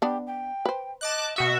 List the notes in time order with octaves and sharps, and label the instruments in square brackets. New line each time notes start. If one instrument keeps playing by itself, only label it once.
[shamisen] B3 D4 [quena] G4
[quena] G5
[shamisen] B4 C5
[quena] D#5 [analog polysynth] A5 D6 F#6
[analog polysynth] B2 F#4 E5 [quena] D#6